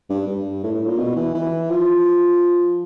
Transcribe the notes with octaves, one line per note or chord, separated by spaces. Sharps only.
G2
G2
A2
A2
A#2
B2
E3
E3
F3